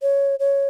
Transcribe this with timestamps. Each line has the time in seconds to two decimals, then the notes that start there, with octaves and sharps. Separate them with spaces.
0.02 C#5
0.40 C#5